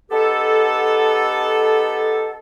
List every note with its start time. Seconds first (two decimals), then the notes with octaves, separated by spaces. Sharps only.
0.11 B3 D#4 G4 A4